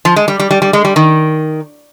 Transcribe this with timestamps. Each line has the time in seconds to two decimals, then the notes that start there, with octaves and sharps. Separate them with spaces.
0.05 F3
0.16 G#3
0.28 G3
0.40 G3
0.51 G3
0.62 G3
0.73 G#3
0.85 G3
0.96 D#3